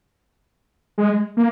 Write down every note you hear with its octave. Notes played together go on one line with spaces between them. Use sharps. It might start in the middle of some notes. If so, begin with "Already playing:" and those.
G#3
A#3